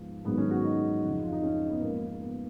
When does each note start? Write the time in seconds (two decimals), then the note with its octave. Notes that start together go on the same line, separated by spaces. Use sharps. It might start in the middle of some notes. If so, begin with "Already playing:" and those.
Already playing: G#2 F3 B3
0.25 G#2 D#3 F#3 B3
0.37 C#4
0.51 F#4
0.64 D#4
1.03 F2 C#3 F3
1.23 F4
1.32 D#4
1.43 C#4
1.69 B3
1.81 G#2 F3 A#3
2.08 A#3
2.22 B3